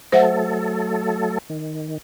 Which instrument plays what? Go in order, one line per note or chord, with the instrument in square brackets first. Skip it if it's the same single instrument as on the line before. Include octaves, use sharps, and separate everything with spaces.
[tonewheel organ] F#3 A3 A4 [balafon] C5 E5 F#5
[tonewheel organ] D#3